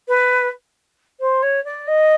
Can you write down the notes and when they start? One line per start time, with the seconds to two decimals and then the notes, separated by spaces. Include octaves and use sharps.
0.08 B4
1.20 C5
1.43 C#5
1.65 D5
1.87 D#5